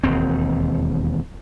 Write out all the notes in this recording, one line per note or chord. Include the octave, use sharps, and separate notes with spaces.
E1 D#2 C4